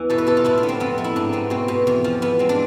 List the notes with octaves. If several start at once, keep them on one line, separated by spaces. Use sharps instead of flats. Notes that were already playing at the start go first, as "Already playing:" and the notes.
Already playing: E2 E3
B2 A4
B4
B2 A4
F4
A2 E4
D4
B3
C4
F2 B3
A3
E4
G#2 D4
B3 C4
B2 C4
B2
E2
F3
E2 B3
G#3 C4
D4